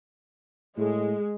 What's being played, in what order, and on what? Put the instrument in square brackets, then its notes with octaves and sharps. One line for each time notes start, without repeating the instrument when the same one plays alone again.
[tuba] A2 [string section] G#3